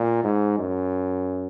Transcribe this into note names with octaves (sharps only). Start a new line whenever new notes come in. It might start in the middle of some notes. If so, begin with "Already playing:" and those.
Already playing: A#2
G#2
F#2